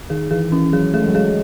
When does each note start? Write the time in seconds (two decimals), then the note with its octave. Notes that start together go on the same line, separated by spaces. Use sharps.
0.10 D#3 G#4
0.31 E3 G#4
0.52 E3 C#4
0.73 F#3 G#4
0.94 A3 G#4
1.01 G#3
1.08 F#3
1.15 G#3 G#4